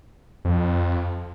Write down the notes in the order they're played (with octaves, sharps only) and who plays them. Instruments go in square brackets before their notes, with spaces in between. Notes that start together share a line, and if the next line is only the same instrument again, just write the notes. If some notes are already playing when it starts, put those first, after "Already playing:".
[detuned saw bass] F2